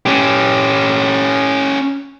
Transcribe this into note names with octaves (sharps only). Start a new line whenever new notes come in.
C#4 G4